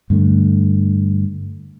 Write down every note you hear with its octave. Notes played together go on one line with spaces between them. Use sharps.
G2 D3 A3